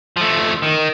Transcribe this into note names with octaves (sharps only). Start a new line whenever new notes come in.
F3 A3
D#3